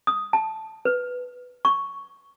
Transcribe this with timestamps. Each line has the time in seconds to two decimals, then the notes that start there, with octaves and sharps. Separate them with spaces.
0.07 D#6
0.33 A5
0.85 B4
1.65 C#6